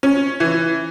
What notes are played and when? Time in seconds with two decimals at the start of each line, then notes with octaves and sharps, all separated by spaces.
0.03 C#4
0.40 E3